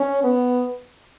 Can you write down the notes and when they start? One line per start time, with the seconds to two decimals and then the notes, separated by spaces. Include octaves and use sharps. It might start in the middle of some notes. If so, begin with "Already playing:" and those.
Already playing: C#4
0.24 B3